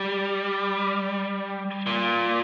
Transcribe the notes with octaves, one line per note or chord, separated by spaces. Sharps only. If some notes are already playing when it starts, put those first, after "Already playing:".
Already playing: G3
A#2